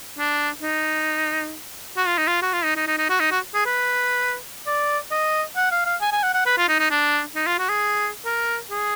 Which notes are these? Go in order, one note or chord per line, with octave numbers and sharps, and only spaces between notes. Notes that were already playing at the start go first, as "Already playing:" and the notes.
D4
D#4
F#4
F4
D#4
F4
F#4
F4
D#4
D#4
D#4
D#4
F#4
D#4
F#4
G#4
B4
D5
D#5
F#5
F5
F5
G#5
G#5
F#5
F#5
B4
F4
D#4
D#4
D4
D#4
F4
F#4
G#4
A#4
G#4